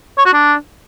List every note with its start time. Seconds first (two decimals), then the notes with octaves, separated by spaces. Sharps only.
0.18 C#5
0.26 F#4
0.33 D4